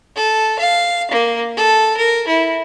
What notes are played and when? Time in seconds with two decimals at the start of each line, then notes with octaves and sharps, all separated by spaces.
0.16 A4
0.59 F5
1.11 A#3
1.57 A4
1.97 A#4
2.28 E4